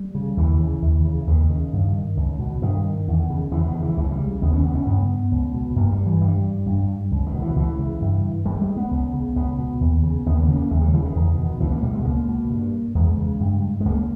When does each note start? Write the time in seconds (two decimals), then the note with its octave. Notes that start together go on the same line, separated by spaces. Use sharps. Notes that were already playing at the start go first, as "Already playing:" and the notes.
Already playing: G3
0.15 C#3
0.37 D#2 E3
0.60 C#3
0.82 D#2
1.05 C#3
1.27 D#2 D#3
1.50 C#3
1.73 G2
2.17 C#2
2.39 B2
2.62 G2 D#3
3.08 E2
3.30 C#3
3.51 E2 E3
3.67 D#3
3.74 C#3
3.82 E3
3.97 C#2 E3
4.11 G3
4.19 C#3
4.42 D#2 B3
4.53 C#4
4.64 C#3 B3
4.75 C#4
4.86 G2 B3
5.32 C#2
5.54 B2
5.76 G2 A#3
5.91 G3
6.06 E3
6.21 G2 G3
6.66 G2
7.11 C#2
7.27 D#3
7.34 B2
7.42 E3
7.56 C#2 E3
7.79 C#3
8.01 G2
8.46 G2 G3
8.62 G#3
8.77 B3
8.91 C#2
9.13 C#3
9.36 C#2 B3
9.58 B2
9.81 D#2
10.03 C#3
10.26 D#2 B3
10.41 A#3
10.48 C#3
10.55 A#3
10.71 D#2 G#3
10.81 G3
10.93 C#3 E3
11.05 D#3
11.15 E2
11.38 B2
11.60 C#2 E3
11.71 A#3
11.82 B2 G3
11.94 G#3
12.05 C#2 A#3
12.27 B2
12.51 G2
12.95 E2 G#3
13.18 C#3
13.40 G2
13.80 G#3
13.85 C#2 A#3